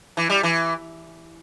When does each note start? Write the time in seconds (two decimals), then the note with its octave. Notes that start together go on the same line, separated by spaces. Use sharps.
0.17 E3
0.30 G3
0.43 E3